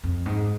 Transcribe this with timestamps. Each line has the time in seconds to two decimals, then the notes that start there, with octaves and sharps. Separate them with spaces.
0.04 F2
0.26 G#2